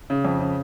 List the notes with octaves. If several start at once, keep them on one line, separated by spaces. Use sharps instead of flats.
C#3
F2
C#3